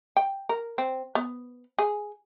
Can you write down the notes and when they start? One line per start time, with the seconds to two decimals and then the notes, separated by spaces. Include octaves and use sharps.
0.17 G5
0.49 A#4
0.78 C4
1.15 B3
1.79 G#4